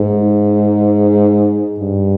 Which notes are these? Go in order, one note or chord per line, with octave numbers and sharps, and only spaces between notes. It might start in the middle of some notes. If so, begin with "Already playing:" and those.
Already playing: G#2
G2